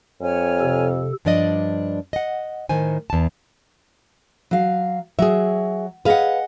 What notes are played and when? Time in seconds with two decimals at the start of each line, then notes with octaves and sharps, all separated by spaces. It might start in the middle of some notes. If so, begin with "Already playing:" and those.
0.21 F2 C#5 G#5 F6
0.60 C3 A4
1.25 G2 F3 D4 D5 D#5
2.13 D#5 F#5
2.69 A2 D#3 C5 G#5
3.10 E2 A5
4.51 F#3 F5
5.19 F#3 G#4 E5
6.05 G#4 B4 D#5 F5 F#5